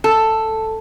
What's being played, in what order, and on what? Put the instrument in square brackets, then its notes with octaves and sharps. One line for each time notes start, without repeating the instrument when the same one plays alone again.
[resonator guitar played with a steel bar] A4